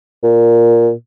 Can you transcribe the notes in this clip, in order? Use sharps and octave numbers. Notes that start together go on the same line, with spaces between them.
A#2